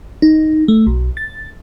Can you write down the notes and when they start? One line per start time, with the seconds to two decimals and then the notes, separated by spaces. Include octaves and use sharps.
0.22 D#4
0.68 A3
0.87 B1
1.17 A6